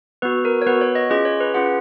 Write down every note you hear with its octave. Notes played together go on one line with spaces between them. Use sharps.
B3 F#4 B4
A#4
C#5
B3 F#4 B4
C#5
D#5
C#4 F4 G#4 D#5
C#5
B4
C#4 F4 G#4 F#5